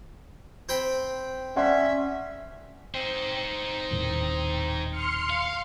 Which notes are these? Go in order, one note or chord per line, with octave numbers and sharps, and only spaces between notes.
C4 G5 B5
C#4 D5 E5 F#5 C6
C4 D#4 C5
C4
D#1 A2 D#3
C6 F6 C#7
F5